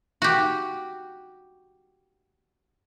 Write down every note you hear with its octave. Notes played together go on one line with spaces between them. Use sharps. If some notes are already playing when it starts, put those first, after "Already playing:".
F#4 G4